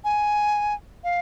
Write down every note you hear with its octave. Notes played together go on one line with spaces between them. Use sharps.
G#5
F5